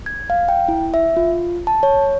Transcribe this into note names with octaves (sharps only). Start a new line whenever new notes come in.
G#6
F5
G5
E4
E5
F4
A5
C#5